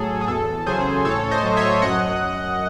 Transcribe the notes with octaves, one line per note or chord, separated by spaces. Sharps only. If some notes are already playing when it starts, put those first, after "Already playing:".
Already playing: A2 F#3 G#4 A4
G#4
E2 A4
C#3 F#3 G#4 C5
A2 A4 C#5
C5 D#5
F#3
C#5 E5
F#2 D#5 F#5